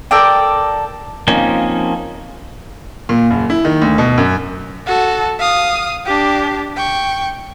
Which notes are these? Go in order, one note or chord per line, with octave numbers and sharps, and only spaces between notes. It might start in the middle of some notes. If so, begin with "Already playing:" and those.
A4 A#4 D5 G5
F3 A#3 C4 C#4 D#4
A#2
F#1
E4
D#3
D2
B2
F#2
F#4 A4
F5 D#6
D4 G4
G5 C#6